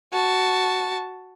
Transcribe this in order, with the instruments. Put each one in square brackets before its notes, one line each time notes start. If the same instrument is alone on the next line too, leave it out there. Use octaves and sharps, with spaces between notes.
[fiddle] F#4 A5